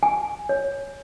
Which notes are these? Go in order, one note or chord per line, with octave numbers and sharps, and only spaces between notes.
G#5
C#5